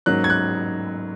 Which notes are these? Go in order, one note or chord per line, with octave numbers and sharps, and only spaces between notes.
G#2 F#3 A#3 C#4 F#6
G#6
F#6